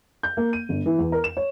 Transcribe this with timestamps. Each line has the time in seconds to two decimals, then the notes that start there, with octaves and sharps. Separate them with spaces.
0.23 G6
0.37 A#3
0.53 D#7
0.69 G1
0.86 E3
0.99 E2
1.12 A#4
1.24 E7
1.37 C#5